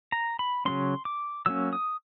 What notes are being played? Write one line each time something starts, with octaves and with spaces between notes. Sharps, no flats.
A#5
B5
C#3 F#3 A#3 C#4 C6
D6
F#3 A#3 C#4 E6
D#6